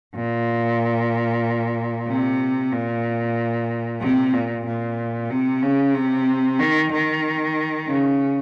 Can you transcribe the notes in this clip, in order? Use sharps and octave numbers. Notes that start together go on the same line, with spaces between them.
A#2
C3
A#2
C3
A#2
A#2
C3
C#3
C3
D#3
D#3
C#3